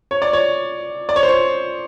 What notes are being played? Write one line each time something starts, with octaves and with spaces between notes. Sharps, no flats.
C#5
D5
C#5
D5
C#5
C5
C#5